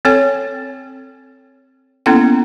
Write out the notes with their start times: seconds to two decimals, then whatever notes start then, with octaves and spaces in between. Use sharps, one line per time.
0.05 C4 A4 C#5 G5
2.06 A#3 B3 C#4 E4 A4 G5